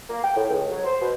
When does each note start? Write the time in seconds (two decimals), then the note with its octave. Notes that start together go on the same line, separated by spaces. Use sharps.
0.10 A#3
0.23 G5
0.36 A2
0.49 C#2
0.70 F#3
0.83 C5
1.01 B2